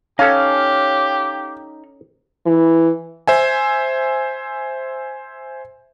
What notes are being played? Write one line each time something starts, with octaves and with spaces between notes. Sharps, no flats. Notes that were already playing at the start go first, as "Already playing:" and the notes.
C#4 D#4 G4 A4 F5 F6
E3
C5 E5 G#5